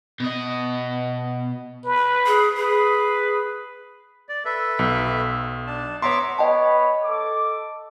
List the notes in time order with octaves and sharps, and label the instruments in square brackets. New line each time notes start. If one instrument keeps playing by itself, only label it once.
[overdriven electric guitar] B2 D#5
[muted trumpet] B4
[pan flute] G#4
[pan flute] G#4 [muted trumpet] B4
[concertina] D5
A4 B4 E5
[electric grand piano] B1
[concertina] D4 A5
[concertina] B3 E5 D6 [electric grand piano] C#5 A#5 C6
[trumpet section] B3 C#5 B5 [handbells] D#5 G5 A5
[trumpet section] A4 D6